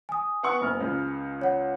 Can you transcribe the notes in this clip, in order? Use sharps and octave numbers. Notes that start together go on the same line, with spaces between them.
G#5 D#6
B3 F#5 C#6
F#1 F6
C#2 C#3
C#5 F#5